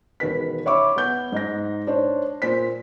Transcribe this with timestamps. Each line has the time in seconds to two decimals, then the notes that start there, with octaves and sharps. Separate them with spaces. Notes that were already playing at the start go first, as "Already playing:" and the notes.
0.20 E1 D#3 B4 B6
0.66 C#5 E5 B5 C#6 D6
0.96 B3 G6
1.32 G#2 D#4 A#6
1.87 D4 C5 C#5
2.42 A#2 C5 B6